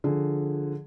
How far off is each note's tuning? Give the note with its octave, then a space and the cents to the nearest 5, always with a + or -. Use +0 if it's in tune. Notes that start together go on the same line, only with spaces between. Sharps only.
D3 +0 F3 +0 G#4 +5